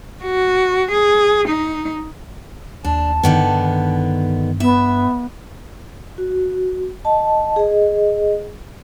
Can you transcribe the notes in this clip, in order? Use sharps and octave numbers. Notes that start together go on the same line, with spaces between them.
F#4
G#4
D#4
D#2 D4 A5
G2 D3 D#3 B3
B3 E5
F#4
D#5 A5
G#4 D#5